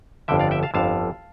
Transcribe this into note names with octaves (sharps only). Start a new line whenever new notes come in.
G1 F2 D3 E5 G5
D5 F5
E5 G5
F5 A5
G1 F2 D3 F5 A5